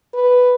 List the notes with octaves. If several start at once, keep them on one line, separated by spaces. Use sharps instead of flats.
B4